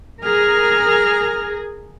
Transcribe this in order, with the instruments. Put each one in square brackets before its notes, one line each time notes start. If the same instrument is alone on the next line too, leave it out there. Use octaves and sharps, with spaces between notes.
[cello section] G#4 A#4 [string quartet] F6